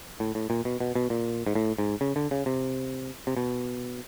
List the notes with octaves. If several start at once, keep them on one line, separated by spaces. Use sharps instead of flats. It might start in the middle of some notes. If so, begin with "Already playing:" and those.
A2
A2
A#2
B2
B2
B2
A#2
G#2
A2
G#2
C#3
D3
C#3
C3
C3
B2